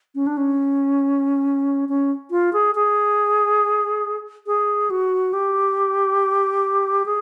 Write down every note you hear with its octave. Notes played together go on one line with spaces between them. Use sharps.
C#4
D4
C#4
C#4
F4
G#4
G#4
G#4
F#4
G4
G#4